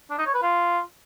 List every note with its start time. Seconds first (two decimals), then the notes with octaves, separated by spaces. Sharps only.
0.10 D4
0.18 D#4
0.26 C#5
0.34 B4
0.42 F4